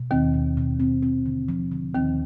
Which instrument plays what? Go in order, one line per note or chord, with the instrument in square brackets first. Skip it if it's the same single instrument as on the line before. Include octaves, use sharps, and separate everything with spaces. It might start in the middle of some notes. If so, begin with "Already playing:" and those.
Already playing: [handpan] B2
[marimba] D#2 D#3 [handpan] C4
[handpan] B2
B2
C4
C4
D3
F3
D3
[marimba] D#2 D#3 [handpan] C4